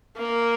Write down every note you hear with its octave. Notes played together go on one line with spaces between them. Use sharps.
A#3